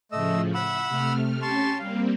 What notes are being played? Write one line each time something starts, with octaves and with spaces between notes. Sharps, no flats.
A2 C#3 F3 A3 D#5 E6
E5 F#5 B5 E6
C3 A3 F6
C#4 G4 A5 C6 C#6
G3 A#3 C4 F5